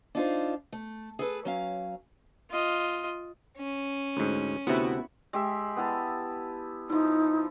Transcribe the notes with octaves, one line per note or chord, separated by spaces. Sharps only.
D4 D#4 F4 C5
A3
G#4 A4 B4
F#3 C#4 F5
F4 D#5
C#4
D2 G#2
D2 C3 B3 E4 F#4
G#3 G4 E5
B3 E4 A5
F3 D#4 E4